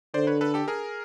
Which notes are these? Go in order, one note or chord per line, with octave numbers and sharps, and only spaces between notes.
D3 C5 D5
B4 C#5
A4 B4
G4 A4
G#4 A#4